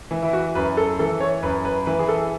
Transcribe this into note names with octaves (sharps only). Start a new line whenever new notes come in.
E3
E4
F#4
F#2 B4
A4
E3 A4
C#5
F#2 B4
B4
E3 B4
G#4
A4